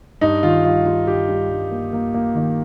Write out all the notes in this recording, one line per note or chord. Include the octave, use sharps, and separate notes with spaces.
G2 D#4
D#3 F4
G3 F4
G3 F4
G2 G4
G3
G2
A#3
A#3
A#3
D#3